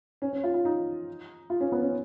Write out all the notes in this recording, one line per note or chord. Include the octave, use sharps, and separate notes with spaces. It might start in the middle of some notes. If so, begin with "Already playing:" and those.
C#4
C#4
F4
F4
D#4
F4
C#4
B3
C#4